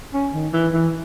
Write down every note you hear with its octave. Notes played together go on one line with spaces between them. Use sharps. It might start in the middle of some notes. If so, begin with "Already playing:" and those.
C#4
D#3
E3
E3